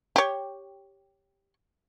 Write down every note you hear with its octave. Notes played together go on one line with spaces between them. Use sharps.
G4 C#5